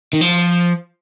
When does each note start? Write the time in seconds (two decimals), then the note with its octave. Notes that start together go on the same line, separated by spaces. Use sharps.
0.13 D#3
0.21 F3